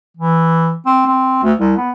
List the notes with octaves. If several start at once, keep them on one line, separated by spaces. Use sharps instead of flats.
E3
C4
C4
D2
C2
B3